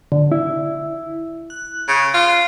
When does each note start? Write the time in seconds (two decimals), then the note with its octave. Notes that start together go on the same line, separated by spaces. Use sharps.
0.12 D3
0.32 E4
1.50 F#6
1.88 C#3
2.14 F4